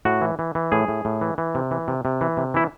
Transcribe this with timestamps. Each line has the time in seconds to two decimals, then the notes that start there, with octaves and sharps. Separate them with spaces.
0.05 A2 F#4
0.21 E3
0.39 E3
0.55 E3
0.72 A2 G#4
0.88 A2
1.05 A2
1.21 E3
1.38 E3
1.55 C3
1.71 E3
1.88 C3
2.05 C3
2.21 E3
2.37 C3
2.54 E3 E4